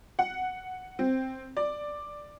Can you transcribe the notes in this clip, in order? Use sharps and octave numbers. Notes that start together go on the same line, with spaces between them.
F#5
C4
D5